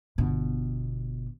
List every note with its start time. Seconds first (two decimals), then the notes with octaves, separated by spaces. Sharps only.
0.18 G1 B2